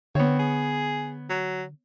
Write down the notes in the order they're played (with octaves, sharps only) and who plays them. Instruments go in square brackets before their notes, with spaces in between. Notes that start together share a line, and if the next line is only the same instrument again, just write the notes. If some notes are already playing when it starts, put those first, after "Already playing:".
[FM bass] D3 [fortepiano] B3 C#5 [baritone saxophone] C4
[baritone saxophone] G#4
F#3